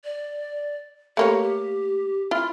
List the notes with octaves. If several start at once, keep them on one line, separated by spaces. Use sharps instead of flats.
D5
A3 A#3 G4 C#5
G4
E4 F4 F6